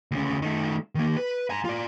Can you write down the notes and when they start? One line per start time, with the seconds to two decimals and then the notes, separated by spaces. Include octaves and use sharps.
0.11 D2 C#3
0.42 D#3 A3
0.95 D#3 A#3
1.17 B4
1.50 G#5 A#5
1.65 F4 D5